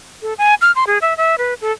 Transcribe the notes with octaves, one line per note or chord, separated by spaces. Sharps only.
A4
G#5
F6
C6
G#4
E5
E5
B4
A4